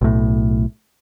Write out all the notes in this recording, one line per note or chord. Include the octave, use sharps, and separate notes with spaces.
B1 A2